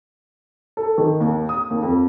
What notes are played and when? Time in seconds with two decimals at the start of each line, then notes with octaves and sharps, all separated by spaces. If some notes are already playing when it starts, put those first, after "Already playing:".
0.77 A4
0.98 D#3
1.21 D#2
1.49 D#6
1.71 D#2
1.83 F2